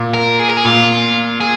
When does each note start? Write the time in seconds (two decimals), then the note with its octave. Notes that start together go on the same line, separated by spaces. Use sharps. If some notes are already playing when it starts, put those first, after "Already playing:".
Already playing: A#2
0.14 A#4
0.39 G#4
0.49 A#4
0.57 G#4
0.65 A#2 F4
1.41 G#4